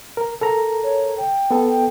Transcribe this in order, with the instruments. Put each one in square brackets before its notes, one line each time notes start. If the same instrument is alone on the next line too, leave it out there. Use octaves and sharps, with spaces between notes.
[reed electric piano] A#4
A4 A#4 A#5
[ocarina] C#5
G5
[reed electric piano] B3 A4
[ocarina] G5